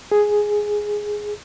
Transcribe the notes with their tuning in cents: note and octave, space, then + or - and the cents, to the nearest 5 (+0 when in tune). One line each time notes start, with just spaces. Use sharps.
G#4 +5